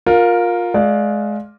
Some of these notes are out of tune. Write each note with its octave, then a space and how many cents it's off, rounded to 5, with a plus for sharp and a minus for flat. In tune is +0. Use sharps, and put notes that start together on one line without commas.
F4 +20 A#4 +0
G#3 +25 D5 +0 F5 +10